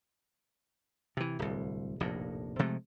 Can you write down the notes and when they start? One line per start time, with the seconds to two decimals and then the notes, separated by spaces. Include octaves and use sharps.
1.17 C3 E3
1.39 D1 C2
2.00 F1 A#1 F2 A2
2.59 C3 F3 G#3 A3